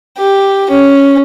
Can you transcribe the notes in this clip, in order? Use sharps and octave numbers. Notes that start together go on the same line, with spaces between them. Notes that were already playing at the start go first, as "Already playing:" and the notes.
G4
C#4